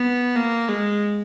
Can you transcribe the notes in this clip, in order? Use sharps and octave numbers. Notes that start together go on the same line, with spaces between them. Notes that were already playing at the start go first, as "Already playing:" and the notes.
Already playing: B3
A#3
G#3